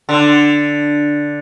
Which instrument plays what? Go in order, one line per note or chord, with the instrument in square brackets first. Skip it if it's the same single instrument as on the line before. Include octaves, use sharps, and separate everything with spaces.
[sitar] D3